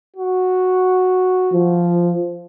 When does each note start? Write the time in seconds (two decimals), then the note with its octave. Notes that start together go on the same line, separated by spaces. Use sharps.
0.16 F#4
1.53 F3